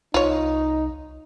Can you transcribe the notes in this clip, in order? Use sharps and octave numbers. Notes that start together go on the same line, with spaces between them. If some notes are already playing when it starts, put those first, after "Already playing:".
C2 D#4 F4 C#5